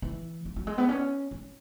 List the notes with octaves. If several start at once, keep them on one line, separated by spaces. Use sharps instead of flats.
E3
F3
F#3
G#3
B3
C#4
C#4